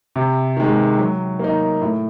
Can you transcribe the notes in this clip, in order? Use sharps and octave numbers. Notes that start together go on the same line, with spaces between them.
C3
D#3 G#3
F#3
A#3 D#4
A2